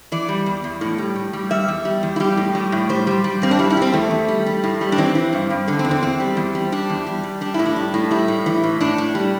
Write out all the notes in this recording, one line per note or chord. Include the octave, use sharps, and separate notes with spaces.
E3 D5
G3
E2
E2
A2
G3
A2
G3
G3 E5
E2
G3
E2
E4
G3 G4
A2
G3
A2
G3 C5
G3
G3
G2 C4
D4
G3 E4
E4
G3 C4
E2 A3
E2
G3
G3
A2
G3
D4
E3 C4
E3
G2
G2
D3 D4
C4
E2
C4
E2 C4
G3
E2
G3
G3 D4
E2
G3
G3
G3 D4
A2 E4
D4
G3
A2
G3 E4
A2
E3
A2
A2 D4
A2
G3